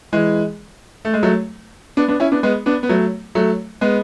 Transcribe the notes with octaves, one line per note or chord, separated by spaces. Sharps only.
E3 G#3
A3
G#3
F#3 A3
B3 D4
B3 D4
C#4 E4
B3 D4
G#3 B3
B3 D4
B3
F#3 A3
F#3 A3
G#3 B3